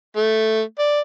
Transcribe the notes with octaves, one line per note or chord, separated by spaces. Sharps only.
A3
D5